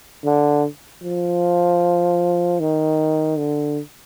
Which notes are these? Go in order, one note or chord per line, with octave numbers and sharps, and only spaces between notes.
D3
F3
D#3
D3